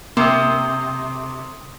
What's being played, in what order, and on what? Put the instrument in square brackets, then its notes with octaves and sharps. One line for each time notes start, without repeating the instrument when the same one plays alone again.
[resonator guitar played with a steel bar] C3 [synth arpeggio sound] A#3 [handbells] C6 D#6